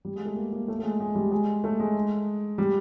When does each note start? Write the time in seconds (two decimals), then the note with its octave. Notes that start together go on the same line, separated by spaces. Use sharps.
0.05 G3
0.16 G#3
0.25 A3
0.36 A#3
0.52 A#3
0.68 A3
0.79 A3
0.83 G#3
1.00 G#3
1.15 G3
1.32 G#3
1.64 A3
1.80 G#3
2.58 G3